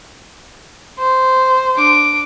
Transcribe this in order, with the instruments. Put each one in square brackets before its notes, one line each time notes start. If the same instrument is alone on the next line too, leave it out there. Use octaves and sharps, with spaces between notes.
[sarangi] C5
[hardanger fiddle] D4 D6